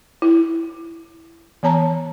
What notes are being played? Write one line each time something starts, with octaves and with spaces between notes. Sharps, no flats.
E4
E3 B3 C#5 A5 A#5